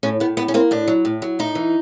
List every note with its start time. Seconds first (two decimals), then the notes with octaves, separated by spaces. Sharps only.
0.03 A2 C#4
0.20 A2 B3
0.37 A2 B3
0.48 C#4
0.54 A#3 C4
0.71 A2 D4
0.88 F#3
1.05 A2
1.22 F#3
1.39 A2 D#4
1.55 E3